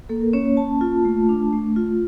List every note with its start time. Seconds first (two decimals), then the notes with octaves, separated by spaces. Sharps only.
0.09 A#3 A4
0.21 A#4
0.33 C#4 C#5
0.45 C#5
0.57 A#3 A5
0.81 F4
1.05 A3
1.29 D4
1.53 A3
1.76 F4